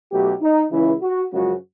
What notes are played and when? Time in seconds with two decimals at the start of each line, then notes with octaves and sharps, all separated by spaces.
0.11 B1 B2 F#3 A3 G4
0.42 D#4
0.71 C#2 C#3 E3 E4
1.02 F#4
1.32 F#2 C#3 F3 G#3 F#4